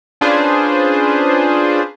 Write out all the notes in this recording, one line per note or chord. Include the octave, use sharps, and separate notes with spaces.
C#4 D4 F4 G#4 B4 C5